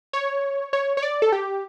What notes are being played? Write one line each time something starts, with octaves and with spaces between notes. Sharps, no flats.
C#5
C#5
C#5
D5
A4
G4